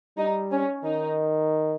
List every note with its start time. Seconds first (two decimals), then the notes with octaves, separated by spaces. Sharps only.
0.18 G3 D#4
0.51 C#4
0.85 D#3 D#4